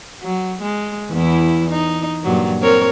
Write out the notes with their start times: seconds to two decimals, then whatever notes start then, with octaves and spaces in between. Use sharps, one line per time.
0.22 F#3
0.62 G#3
1.12 E2 E3 E4
1.69 D#4
2.23 G2 A#2 F#3
2.61 C4 A#4 C#5